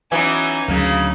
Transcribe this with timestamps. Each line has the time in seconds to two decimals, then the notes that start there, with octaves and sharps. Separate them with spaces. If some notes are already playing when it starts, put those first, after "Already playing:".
0.12 E3 F#3 B3 C#4 D#4 G#5
0.68 D2 C#3 F#3 A#3